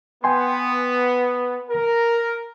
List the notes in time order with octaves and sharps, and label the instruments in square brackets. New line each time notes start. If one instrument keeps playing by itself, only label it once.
[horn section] B3 [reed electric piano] G5 G#5 C6
[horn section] A#4